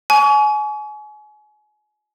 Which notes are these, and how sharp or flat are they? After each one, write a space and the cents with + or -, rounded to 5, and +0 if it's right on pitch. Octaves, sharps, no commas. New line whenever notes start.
G#5 +30 C#6 +40